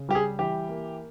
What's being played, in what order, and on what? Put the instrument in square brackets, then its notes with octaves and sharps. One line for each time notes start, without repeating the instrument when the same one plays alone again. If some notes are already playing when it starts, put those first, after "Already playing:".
Already playing: [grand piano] C#3
G3 G4
G#4
E3 G4
A#3